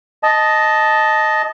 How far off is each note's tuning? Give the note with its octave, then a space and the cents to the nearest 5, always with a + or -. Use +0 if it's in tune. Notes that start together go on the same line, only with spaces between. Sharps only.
D#5 +0 A5 -10